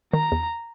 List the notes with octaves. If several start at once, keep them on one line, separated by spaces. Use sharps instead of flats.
D#3 A#5
E2